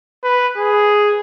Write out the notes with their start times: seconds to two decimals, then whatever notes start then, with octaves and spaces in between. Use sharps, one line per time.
0.24 B4
0.57 G#4